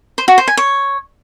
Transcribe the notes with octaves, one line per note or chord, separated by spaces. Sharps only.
C5
F#4
C5
G#5
C#5